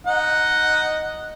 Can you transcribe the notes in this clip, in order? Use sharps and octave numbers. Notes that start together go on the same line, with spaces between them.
D#4 F#5